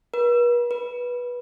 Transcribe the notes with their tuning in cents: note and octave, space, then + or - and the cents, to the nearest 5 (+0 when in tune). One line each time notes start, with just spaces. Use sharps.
B4 -45
B4 -15